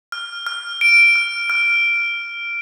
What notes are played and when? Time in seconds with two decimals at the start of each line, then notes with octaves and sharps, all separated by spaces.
0.12 F6
0.46 F6
0.81 D7
1.16 F6
1.50 F6